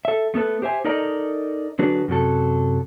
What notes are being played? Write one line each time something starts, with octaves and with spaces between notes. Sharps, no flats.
A4 E5
A3 B3 A4 B4
G4 C5 E5 G#5
D#4 A4 A#4 D5 D#5 A#5
D3 F#3 D4 F#4 G#4 B4
F#2 C3 F#3 A4